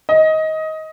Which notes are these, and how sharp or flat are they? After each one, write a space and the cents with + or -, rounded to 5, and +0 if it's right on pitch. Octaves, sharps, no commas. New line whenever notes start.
D#5 +20